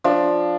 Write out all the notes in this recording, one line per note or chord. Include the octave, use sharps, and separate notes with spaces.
F3 D4